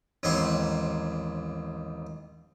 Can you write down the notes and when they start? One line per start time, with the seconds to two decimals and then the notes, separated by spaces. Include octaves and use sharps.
0.23 A1 D#2 G#2 C4 C#5 C6